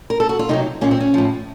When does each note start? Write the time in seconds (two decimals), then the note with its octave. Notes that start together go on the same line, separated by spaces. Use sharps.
0.10 A#4
0.20 A4
0.29 F#4
0.39 F4
0.49 C3 D#3 F#3 D#4
0.81 A#2 F3 C#4
0.91 C4
1.00 C#4
1.14 A2 F3